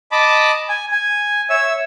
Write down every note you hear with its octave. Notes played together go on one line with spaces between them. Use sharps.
D#5 A5 B5 D6
G#5
G#5
C#5 E5 E6